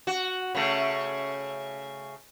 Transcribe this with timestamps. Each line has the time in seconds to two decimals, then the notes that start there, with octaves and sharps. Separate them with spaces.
0.07 F#4
0.55 C#3 A3